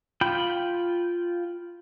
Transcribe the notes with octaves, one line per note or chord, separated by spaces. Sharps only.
F4 G5 B5